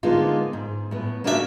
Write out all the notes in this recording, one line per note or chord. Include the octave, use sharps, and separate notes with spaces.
D3 G#3 A#3 B3 D#4 F4
G#2
A2 B3
A#3 C#4 D4 F#4 G#4 E5